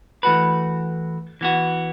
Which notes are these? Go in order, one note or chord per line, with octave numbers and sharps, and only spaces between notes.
E3 A3 F#4 B4
E3 B3 F#4